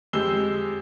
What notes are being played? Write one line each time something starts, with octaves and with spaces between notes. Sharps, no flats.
F2 G#3 G4 E6 G7